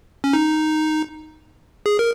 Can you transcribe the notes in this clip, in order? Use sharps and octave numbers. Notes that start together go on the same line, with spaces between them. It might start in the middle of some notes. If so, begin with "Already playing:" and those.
C#4
D#4
G#4
A#4